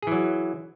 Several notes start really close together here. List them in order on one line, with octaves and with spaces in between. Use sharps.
G#4 E3 F#3